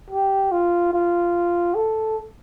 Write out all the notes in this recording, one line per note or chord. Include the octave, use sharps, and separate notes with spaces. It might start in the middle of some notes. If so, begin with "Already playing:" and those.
G4
F4
F4
A4